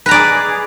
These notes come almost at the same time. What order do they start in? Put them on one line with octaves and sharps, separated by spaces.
B4 A#5 D5 G#4